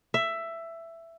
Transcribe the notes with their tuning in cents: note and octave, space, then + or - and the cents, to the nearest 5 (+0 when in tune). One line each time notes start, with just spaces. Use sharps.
E5 +10